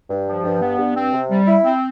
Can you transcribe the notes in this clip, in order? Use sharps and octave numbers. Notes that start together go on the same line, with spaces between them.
G2
F3
G2
B3
G2
C4
C3
G3
E4
C4